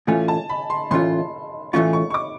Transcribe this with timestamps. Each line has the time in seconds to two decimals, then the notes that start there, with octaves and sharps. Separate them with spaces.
0.07 A2 E3 A3 C#4 F4 G#5
0.28 A5
0.49 B5
0.70 C6
0.91 A2 E3 A3 C#4 F4 C6
1.73 A2 E3 A3 C#4 F4 C#6
1.93 C#6
2.10 C#6
2.14 D6